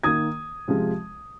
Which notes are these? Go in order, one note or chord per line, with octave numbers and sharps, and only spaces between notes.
D#3 A#3 D#6 G#6
C3 F3 G#3